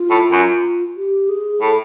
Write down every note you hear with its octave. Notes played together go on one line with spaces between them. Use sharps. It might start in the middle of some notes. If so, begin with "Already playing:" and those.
Already playing: F4
A2
F#2
G4
G#4
A2 A4